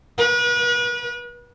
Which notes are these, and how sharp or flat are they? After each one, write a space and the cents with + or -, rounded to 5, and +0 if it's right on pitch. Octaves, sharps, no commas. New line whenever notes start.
B4 -40